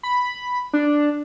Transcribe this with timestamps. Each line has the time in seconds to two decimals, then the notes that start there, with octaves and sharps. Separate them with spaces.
0.03 B5
0.73 D4